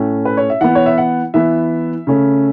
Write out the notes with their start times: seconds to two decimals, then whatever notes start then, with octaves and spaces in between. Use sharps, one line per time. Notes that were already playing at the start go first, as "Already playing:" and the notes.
Already playing: A2 A3 C#4
0.25 B4
0.37 C#5
0.50 E5
0.61 E3 B3 F#5
0.75 C#5
0.86 E5
0.98 F#5
1.34 E3 B3 E5
2.07 C#3 A3 C#4